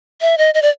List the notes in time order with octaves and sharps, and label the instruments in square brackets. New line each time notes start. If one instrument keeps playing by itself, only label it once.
[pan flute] E5
D#5
D#5
D5